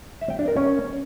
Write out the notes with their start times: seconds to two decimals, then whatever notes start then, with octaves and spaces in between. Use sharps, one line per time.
0.21 E5
0.30 G5
0.39 D4
0.48 A#4
0.57 C#4